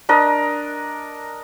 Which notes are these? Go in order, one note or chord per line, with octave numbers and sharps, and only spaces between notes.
D4 A#4 D#5